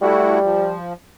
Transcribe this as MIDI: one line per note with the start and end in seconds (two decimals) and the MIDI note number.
0.02 0.74 55
0.02 0.39 57
0.02 0.39 64
0.02 0.39 66
0.44 0.93 53